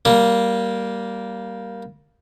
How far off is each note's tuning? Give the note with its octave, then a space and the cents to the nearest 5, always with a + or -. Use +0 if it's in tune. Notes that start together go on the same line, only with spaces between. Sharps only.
G3 -15 A#3 +0